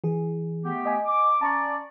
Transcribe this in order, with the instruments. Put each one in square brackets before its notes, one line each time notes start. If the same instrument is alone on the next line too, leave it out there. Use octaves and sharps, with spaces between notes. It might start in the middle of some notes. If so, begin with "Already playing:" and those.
[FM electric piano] E3 G#4
[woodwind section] A3 B3 G4
[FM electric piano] D#5 G#5
[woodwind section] D6
[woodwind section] C#4 D5 [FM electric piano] A5 A#5 C#6